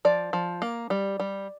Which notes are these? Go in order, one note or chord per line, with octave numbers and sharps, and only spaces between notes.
F3 D5
F3
A#3
G3
G3